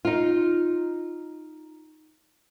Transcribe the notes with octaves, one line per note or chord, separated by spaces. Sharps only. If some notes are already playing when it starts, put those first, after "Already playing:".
D#4 F4